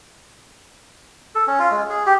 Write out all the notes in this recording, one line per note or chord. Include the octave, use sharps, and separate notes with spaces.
A4
C#4
F4
G#3
G#4
G4